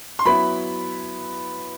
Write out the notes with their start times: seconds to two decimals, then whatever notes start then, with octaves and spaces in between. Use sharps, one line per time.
0.19 C6
0.25 F#3 B3 E4 B5